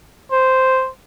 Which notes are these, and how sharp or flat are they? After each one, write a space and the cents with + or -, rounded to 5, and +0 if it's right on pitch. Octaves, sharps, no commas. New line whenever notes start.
C5 -5